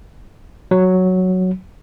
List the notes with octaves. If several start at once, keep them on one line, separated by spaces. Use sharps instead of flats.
F#3